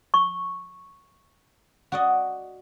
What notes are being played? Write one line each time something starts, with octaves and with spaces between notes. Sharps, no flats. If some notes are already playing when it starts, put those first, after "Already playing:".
C#6
F#4 D5 D#5